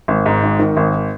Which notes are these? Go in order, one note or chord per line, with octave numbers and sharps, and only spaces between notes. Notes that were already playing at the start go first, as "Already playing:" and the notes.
G#1
G#2
G#1
D#3
G#1